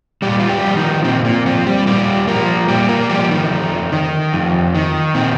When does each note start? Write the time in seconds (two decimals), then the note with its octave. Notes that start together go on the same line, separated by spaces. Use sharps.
0.22 A#2 G3 G4
0.40 F4
0.50 G3 G4
0.64 F3
0.77 D#3 D#4
1.04 A#2 C4
1.25 A#3
1.46 F3 C4
1.67 G3 G4
1.87 A#2 G3 G4
2.27 F3 A#3 A#4
2.68 A#2 G3 G4
2.89 A#3 A#4
3.09 F3 G3 G4
3.30 D#3 D#4
3.50 F2
3.92 D#3
4.33 F2
4.75 D#3
5.14 A#2 C4